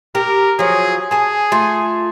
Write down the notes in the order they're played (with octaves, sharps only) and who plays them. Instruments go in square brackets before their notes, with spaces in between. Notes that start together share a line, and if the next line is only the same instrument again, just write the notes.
[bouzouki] G4 [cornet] A#4
[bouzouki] F3 F#3 [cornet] G#4
[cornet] G#4 [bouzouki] G#5 A5
[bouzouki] A3 F4